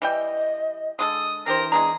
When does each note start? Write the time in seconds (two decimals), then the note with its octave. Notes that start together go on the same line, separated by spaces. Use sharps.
0.02 E3 G3 D#5 G5
0.99 D3 G#3 A4 D#6
1.46 E3 D4 G4 A#4 C5
1.72 G#3 B3 D4 G#4 A#5